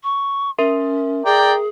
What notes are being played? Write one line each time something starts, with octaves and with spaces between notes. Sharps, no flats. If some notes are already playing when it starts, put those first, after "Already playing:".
C#6
C#4 A#4 E5 C6
G#4 D5 G5 A#5